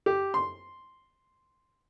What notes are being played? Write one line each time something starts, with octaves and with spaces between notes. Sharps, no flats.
G4
C6